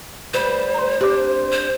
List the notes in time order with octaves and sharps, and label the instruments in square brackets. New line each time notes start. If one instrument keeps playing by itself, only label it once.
[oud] D2 G3 B4 [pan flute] C5
[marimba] A#5 C6
[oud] C4 D4 [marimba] G4 D6
[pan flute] C5